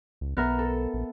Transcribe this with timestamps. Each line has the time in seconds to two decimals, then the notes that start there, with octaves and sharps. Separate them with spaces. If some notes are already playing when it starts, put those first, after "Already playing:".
0.21 C#2
0.37 B1 B3 A#4 E5
0.59 A4
0.94 A#1